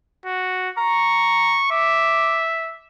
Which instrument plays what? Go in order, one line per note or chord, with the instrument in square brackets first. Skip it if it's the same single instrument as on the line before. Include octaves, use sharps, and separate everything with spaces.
[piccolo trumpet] F#4
[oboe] A#5 [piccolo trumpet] C#6
[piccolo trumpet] E5 [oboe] D6